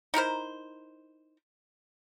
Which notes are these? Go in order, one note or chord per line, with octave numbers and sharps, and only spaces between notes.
D#4 E4 A#4 C5